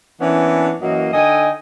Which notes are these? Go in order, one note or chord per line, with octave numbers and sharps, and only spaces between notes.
E3 A#3 B3 C#4 D4
F#2 E3 F#3 A#3 D#5
D3 D#4 A4 D#5 G5 G#5